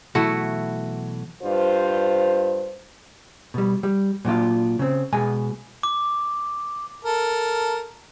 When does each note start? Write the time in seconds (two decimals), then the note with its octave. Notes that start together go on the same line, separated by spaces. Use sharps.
0.15 B2 E3 F#3 A3 E4 F#4
1.43 G2 F4 C5
3.54 B2 G3
3.83 G3
4.25 A#2 F#3 D4 F4
4.79 C#3 C4
5.13 B2 G#3 G#5
5.83 D6
7.05 A4 A#4